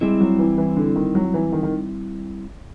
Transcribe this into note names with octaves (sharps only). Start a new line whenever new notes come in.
G3 G#3 C4 E4
F#3
E3
E3
D3
D#3
F#3
E3
D#3
D#3